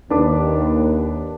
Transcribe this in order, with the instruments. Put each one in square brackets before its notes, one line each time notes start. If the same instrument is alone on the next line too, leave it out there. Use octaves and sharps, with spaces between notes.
[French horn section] D#2 [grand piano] D4 B4 D6